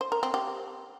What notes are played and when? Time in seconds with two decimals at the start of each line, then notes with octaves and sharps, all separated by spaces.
0.01 C5
0.12 A#4
0.23 C4
0.34 G4